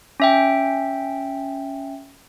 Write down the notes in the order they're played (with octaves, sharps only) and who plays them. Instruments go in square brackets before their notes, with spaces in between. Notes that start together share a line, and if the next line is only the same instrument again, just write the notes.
[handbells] C#4 E5 G5